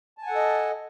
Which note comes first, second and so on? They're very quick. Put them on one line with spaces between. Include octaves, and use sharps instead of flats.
A5 G#5 F#5 A4 D#5